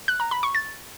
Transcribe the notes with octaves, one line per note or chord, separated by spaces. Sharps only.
F#6
A#5
B5
C#6
A6